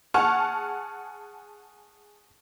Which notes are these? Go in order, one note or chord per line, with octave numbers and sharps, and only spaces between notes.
G#4 F#5 A5 C#6 F6